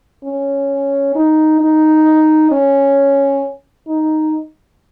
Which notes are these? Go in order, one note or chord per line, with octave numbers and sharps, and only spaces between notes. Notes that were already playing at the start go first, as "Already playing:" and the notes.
C#4
D#4
D#4
C#4
D#4